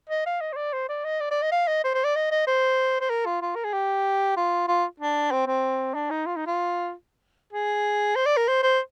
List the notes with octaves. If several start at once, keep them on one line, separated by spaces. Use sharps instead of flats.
D#5
F5
D#5
C5
D5
C5
D5
D#5
D5
D5
D#5
F5
D#5
C5
C5
D5
D#5
D#5
C5
C5
A#4
F4
F4
A#4
G#4
G4
F4
F4
D4
C4
C4
D4
D#4
F4
D#4
F4
G#4
C5
D5
A#4
C5
C5